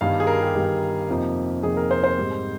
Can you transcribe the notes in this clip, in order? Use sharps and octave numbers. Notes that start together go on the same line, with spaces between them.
G1 G2 D#3 G3 F5
G#4
A#4
G4
G1 G2 D#3 G3
F2 C3 F3 A#3 D#4
F2 C3 F3 A#3 D#4 G#4
A#4
C5
C5
G#2 G3 C4